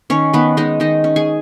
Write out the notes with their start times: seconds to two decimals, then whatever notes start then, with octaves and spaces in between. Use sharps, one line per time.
0.10 D#3 C#4 C#5
0.33 D#3 B3 B4
0.57 G#3 D#4 D#5
0.80 D#3 D#4 D#5
1.04 C#4
1.16 G#4 G#5